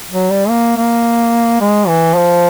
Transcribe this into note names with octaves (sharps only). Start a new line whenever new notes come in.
F#3
G3
A#3
A#3
G#3
E3
F3